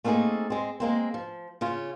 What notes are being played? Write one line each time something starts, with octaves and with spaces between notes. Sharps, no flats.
A3 A#3 C4 D#4 G#4 A4
G#3 C4
G#3 A#3 C4
F3
C#3 C#4 F4